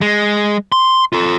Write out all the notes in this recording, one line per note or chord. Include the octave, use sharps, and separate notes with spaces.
G#3
C6
F4 A4